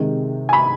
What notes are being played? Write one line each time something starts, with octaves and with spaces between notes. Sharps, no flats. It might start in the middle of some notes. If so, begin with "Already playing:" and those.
Already playing: C3 D#3 G#3
G#5
B5